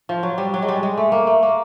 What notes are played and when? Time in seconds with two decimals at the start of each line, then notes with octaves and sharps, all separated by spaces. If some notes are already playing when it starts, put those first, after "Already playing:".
0.09 F3
0.23 F#3
0.38 G3
0.54 F#3
0.62 G#3
0.69 G3
0.83 G#3
0.97 A3
1.12 A#3
1.27 A3
1.43 A#3